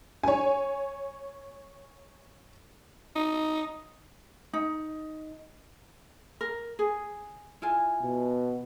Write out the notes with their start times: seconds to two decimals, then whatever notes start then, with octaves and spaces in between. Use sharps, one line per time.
0.24 C#5 G#5
3.16 D#4
4.53 D#4
6.41 A#4
6.79 G#4
7.62 E4 F4 G#5
8.02 B2